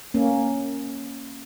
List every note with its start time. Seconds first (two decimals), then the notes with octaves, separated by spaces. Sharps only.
0.14 A#3 C#4